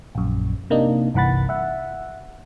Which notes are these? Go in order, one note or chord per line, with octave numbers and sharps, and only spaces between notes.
A#1 F#2
C3 A#3 D4 D#4
G1 C2 E3 F#5 B5 A6
E5 F#5